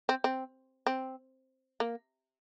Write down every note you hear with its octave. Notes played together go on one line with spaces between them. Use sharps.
C4
C4
C4
A#3